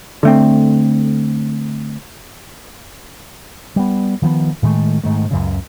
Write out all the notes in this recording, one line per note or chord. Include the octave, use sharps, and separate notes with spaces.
D3 A3 C4
G3 B3
D#3 F3 G3 B3
A2 D#3 G#3 A3
G#2 D#3 A3
C#2 F#2 C#3